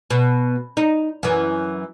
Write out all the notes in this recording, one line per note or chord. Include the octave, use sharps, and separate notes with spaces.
B2
D#4
F#2 E3